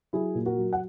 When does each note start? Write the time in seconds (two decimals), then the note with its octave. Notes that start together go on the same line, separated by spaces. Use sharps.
0.13 F#3 E4 G#4
0.35 A#2
0.46 F#4 A#4
0.57 F#3
0.73 F#5